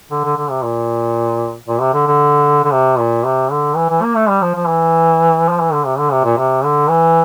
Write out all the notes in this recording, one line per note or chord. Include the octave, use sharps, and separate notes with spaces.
D3
D3
D3
C3
A#2
A#2
C3
D3
D3
D3
C3
A#2
C3
D3
E3
E3
A#3
A3
G3
F3
F3
E3
F3
E3
D3
C3
D3
C3
A#2
C3
D3
E3